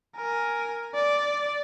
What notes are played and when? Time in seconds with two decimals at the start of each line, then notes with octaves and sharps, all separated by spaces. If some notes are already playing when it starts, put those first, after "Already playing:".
0.16 A#4 G#5
0.95 D5